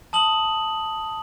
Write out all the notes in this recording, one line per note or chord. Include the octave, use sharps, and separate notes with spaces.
A5 D#6 F#7